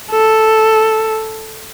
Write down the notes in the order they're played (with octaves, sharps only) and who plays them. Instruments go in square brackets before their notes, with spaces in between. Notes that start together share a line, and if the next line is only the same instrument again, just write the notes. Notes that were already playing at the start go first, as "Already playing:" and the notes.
[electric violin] A4